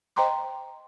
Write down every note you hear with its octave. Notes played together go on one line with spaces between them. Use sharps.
C5 D#5 G5 A#5 C6 D6